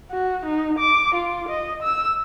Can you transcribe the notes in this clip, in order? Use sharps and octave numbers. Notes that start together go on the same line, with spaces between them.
F#4
D#4
D6
F4
D#5
E6